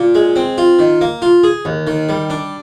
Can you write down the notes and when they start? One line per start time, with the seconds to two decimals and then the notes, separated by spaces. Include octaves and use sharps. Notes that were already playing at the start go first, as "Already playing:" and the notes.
Already playing: A#2
0.15 G#3
0.36 C4
0.58 F4
0.79 D#3
1.01 A#3
1.22 F4
1.44 G#4
1.65 D#2
1.87 D#3
2.09 G3
2.30 D4